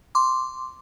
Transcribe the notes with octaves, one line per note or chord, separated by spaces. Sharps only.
C6 D6